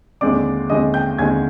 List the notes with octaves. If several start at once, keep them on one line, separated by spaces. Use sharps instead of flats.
D#2 D3 G#3 C4 D5 D6
D#2 D3 G#3 C4 D#5 D#6
G5 G6
D#2 D3 G#3 C4 G#5 G#6